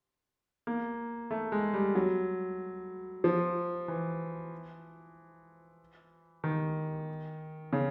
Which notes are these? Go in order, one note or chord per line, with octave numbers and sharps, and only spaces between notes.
A#3
A3
G#3
G3
F#3
F3
E3
D#3
C#3